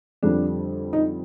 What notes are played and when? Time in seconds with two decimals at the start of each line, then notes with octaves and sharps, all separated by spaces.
0.23 F2 D3 G3 D4
0.93 D#4